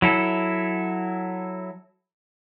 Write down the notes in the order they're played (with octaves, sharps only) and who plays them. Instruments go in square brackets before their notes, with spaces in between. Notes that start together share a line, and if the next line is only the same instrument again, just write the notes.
[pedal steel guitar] F#3 E4 A4